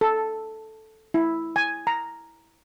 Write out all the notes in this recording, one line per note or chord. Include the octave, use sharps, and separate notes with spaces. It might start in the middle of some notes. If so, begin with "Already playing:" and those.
A4
E4
G#5
A#5